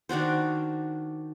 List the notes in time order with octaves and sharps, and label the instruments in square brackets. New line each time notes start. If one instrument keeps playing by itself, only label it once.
[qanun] D#3 D4 F#4 C5